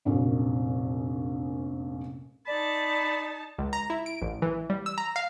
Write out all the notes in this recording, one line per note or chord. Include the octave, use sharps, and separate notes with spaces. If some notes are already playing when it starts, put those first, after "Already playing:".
F1 A#1 F#2 A#4
D#4 D5 A5 B5
C#2
A#5
E4
D7
A1
E3
G3
E6
A#5
F5